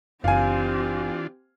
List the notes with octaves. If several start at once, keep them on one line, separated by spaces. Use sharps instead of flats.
F#1 E3 C4 D4 F4 G4 F5 G#5